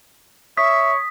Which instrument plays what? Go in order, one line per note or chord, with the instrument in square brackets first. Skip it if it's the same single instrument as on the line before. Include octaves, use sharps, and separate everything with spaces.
[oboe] C#5 [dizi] E5 [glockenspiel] D#6 B6